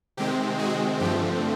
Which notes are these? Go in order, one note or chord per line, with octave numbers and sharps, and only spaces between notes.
C3 D#3 G#3 C4 G4
F#4 G#4
G2 D3 F3 A3 C4 G4